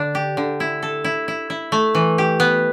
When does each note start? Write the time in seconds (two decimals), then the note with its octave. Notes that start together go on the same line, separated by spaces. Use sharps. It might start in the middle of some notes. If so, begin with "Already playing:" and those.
Already playing: D3 D4
0.15 G4
0.37 D3
0.60 E4
0.83 A4
1.04 E4
1.28 E4
1.50 E4
1.72 A3
1.95 E3
2.18 G4
2.40 B3